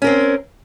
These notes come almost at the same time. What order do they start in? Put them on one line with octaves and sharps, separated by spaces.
C#4 A#4 C4